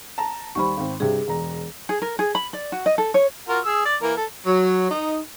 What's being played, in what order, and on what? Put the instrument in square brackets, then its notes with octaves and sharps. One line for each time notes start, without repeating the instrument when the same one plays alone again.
[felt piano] A5 A#5
[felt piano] D#2 G3 C5 [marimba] B5 C#6
[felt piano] G#1 C4
[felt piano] G2 C3 [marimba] G#4
[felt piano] E1 A#5
[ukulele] G#4
A#4
G#4
B5
D5
F#4
D#5
A4
C#5
[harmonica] F4 F#4 A#4
G#4 E6
D5
E3 A#3 A#4
A4
[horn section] F#3
D#4